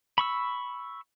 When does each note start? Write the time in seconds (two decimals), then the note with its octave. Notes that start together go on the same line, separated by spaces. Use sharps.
0.18 B5 C#6 E6